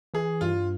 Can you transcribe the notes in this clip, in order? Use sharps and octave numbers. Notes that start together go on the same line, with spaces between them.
E3 G#4
G2 F4